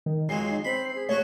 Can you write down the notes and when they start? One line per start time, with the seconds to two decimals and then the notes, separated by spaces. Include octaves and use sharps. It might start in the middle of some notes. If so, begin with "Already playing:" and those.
0.06 D#3
0.29 F2 F#3 G#3 G#5 C7
0.50 D#4
0.65 C4 B5
0.95 G#4
1.09 A3 F#4 C#5